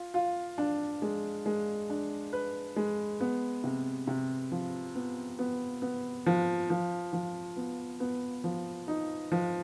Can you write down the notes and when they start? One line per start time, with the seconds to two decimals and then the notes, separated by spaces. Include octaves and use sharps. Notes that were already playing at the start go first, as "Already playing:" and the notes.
Already playing: F4
0.14 F4
0.58 D4
1.02 G#3
1.46 G#3
1.90 D4
2.33 B4
2.76 G#3
3.20 B3
3.64 C3
4.07 C3
4.52 F3
4.95 B3
5.39 B3
5.82 B3
6.26 F3
6.70 F3
7.13 F3
7.56 B3
8.00 B3
8.44 F3
8.88 D#4
9.32 F3